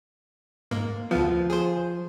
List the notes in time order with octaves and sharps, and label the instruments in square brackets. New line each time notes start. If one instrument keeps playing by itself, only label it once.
[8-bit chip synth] G#2 A#3
[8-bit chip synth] D2 B3 [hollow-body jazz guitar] F3
[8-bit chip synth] G#4 C5